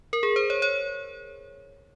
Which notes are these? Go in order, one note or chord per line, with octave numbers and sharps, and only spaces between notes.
A#4
G#4
C5
C#5
C#5